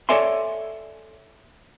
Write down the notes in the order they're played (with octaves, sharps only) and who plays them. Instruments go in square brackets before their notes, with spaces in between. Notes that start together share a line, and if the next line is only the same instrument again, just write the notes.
[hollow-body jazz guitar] A4 C#5 D5 E5 G#5 C6